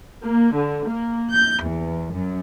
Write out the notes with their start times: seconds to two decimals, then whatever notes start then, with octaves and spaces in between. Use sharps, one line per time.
0.23 A#3
0.54 D3
0.86 A#3
1.32 G6
1.63 E2
2.11 F#2